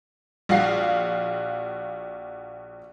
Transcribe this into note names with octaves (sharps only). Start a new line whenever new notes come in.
A#1 F#4 F5 C7